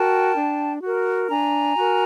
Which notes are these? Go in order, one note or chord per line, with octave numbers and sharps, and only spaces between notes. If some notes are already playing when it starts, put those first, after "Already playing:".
Already playing: F#4 A#4 G5 A5
D4
F#4 A#4
D4 G#5 A#5
F#4 A#4